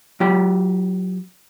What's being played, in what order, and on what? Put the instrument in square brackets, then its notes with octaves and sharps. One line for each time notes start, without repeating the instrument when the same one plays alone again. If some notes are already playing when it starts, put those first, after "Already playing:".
[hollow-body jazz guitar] F#3 F4 G4 G5